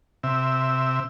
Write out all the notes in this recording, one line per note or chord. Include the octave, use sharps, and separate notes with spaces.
C3 E5